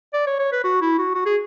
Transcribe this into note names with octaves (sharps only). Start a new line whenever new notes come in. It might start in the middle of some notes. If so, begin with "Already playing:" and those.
D5
C#5
C#5
B4
F#4
E4
F#4
F#4
G#4